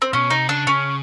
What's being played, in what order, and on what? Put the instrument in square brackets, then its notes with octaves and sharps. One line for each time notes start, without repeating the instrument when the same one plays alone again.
[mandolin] C4
[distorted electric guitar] B2 [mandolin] C#4
[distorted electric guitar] C3 [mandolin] D#4
[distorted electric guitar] C#3 [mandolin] D4
[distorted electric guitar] C#3 [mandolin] C#4